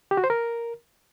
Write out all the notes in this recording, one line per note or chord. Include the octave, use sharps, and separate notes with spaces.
G4
F#4
C5
A#4